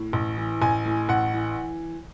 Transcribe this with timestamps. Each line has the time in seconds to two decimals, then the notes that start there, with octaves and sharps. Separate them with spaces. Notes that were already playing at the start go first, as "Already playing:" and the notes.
Already playing: A2
0.13 A1
0.37 E3
0.62 A1 G#5
0.85 A2
1.09 A1 F#5
1.34 E3